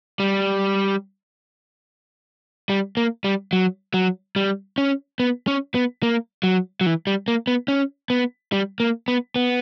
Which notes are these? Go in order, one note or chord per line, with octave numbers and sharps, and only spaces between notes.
G3
G3
A#3
G3
F#3
F#3
G3
C#4
B3
C#4
B3
A#3
F#3
F#3
E3
G3
A#3
B3
C#4
B3
G3
A#3
B3
B3